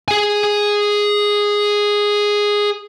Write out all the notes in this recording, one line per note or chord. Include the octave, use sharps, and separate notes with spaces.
G#4 G#5